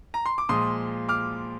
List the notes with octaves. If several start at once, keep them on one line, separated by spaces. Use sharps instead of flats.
A#5
C6
D6
A#2 F3 G#3 C6 D#6
D6 F6